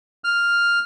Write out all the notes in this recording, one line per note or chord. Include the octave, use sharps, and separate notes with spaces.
F6